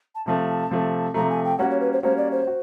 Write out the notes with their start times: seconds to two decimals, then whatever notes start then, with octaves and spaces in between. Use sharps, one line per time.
0.15 A5
0.26 C3 F3 A3 A5
0.70 C3 F3 A3
1.14 C3 F3 A3 A#5
1.30 G#5
1.45 G5
1.58 G3 A#3 C#4 F#4 F#5
1.70 C#5
1.80 B4
1.93 C5
2.03 G3 A#3 C#4 F#4 C5
2.17 D5
2.32 C5
2.47 F#4